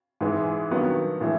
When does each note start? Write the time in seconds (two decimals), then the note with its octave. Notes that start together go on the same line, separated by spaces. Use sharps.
0.21 G#2 E3 G#3
0.71 G2 D#3 F#3 B3
1.21 A2 E3 G#3